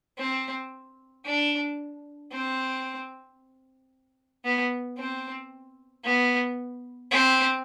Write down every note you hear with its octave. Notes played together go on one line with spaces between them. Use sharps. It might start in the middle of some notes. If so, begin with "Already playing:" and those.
C4
D4
C4
B3
C4
B3
C4